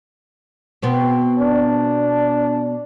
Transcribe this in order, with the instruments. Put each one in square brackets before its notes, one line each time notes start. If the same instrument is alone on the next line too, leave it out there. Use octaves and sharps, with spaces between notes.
[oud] B2 B3 C4
[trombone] D4